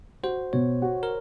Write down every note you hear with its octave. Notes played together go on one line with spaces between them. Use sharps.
F#4 C5
B2 C#5
F#4
A#4